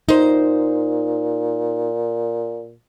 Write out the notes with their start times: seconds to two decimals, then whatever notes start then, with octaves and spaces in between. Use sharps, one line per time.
0.09 A#2 D#4 C5